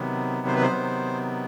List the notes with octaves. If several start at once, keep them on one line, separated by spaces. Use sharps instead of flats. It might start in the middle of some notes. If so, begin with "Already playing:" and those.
Already playing: C3 D#3 F#3 B3
C5
B4
C5
C3 D#3 F#3 B3